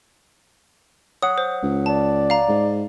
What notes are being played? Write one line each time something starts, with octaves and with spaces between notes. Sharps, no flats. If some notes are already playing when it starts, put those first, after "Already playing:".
C#5 F#5 D#6
C5
C#2
D5 A5
F5 A#5
G#2